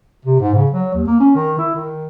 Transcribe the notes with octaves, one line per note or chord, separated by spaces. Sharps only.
C3
G#2
C#3
F#3
D#2
A#3
C#4
D#3
E4
D#3